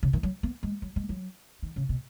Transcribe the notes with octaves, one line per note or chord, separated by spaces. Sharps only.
C#3
D#3
F#3
B3
G#3
F#3
G#3
F#3
D#3
C#3
B2